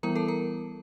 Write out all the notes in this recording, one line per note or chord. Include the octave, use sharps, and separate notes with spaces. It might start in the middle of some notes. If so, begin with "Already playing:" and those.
E3 G3 B3 E4 A#4 A#5
A4 A5
A#4 A#5